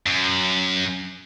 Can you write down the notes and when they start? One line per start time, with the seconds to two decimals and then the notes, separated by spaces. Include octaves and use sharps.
0.06 F#2